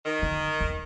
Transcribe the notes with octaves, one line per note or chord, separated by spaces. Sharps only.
D#3
D3
E2